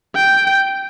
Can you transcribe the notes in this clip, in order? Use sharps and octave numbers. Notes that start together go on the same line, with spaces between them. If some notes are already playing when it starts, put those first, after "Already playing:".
G5